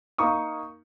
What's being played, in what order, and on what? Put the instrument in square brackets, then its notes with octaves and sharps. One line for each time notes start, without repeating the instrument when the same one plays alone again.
[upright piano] A#3 D#4 F5 C#6 D#6